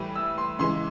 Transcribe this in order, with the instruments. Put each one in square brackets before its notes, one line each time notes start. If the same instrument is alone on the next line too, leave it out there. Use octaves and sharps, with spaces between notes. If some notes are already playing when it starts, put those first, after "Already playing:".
Already playing: [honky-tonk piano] A2 E3 G3
[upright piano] E6
C6
[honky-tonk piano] C#3 E3 G#3 [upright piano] C6